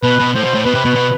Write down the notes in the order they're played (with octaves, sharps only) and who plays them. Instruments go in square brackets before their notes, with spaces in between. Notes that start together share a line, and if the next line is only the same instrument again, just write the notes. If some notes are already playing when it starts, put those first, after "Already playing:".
[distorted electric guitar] B2 [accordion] B4
[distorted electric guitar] B2
[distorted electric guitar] A2 [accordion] C5
[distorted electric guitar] B2
A2
[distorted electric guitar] B2 [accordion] B4
[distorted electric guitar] C3
B2
B2